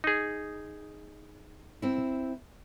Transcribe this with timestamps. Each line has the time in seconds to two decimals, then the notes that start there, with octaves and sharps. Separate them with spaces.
0.04 D#4 G#4
1.82 C4 E4